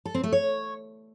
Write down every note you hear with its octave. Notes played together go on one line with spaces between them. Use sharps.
A4
C4
A3
C#5